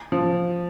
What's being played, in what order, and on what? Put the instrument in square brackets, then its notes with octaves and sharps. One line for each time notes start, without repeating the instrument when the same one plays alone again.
[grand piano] F3